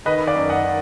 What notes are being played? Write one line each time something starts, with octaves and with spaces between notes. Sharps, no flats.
D#3 B4 D#5
D5 F5
F#2
D#5 F#5
D#3